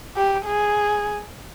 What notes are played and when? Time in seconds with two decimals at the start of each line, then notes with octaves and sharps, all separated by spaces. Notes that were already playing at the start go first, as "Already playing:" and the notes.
0.17 G4
0.46 G#4